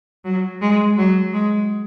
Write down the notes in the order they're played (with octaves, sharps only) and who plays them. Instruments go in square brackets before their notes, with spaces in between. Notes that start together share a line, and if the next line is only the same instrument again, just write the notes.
[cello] F#3
G#3
F#3
G#3